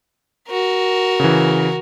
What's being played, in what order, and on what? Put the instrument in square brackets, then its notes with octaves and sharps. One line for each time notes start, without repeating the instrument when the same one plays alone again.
[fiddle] F#4 A#4
[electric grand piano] C#3 E3